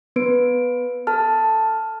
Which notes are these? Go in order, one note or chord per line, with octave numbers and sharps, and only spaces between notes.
B3 B4 D7
A4 A5 F6